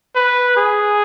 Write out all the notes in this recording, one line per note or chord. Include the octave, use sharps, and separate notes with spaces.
B4
G#4